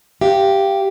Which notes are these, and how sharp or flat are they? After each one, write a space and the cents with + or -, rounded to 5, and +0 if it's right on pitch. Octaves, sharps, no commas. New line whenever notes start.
G4 +0 F5 -30